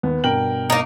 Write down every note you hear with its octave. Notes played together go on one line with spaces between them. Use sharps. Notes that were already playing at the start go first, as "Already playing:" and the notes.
D#2 B3
G2 B2 A#4 G5 F#7
A#3 D#4